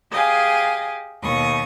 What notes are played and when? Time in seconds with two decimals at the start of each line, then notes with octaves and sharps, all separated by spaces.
0.11 G4 G#4 D#5 F5 G#5
1.22 D#2 B2 C#6 D#6